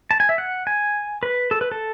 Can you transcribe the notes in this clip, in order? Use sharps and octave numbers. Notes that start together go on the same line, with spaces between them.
A5
G#5
E5
F#5
G#5
B4
A4
B4
A4